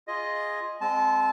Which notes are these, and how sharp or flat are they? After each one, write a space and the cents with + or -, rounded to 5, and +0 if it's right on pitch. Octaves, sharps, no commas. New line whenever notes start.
F4 +0 G#4 +0 D#5 +0
G#3 -20 C4 +0 A5 -25